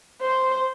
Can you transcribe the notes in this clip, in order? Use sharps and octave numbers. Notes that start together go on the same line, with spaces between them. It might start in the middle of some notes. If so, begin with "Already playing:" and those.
C5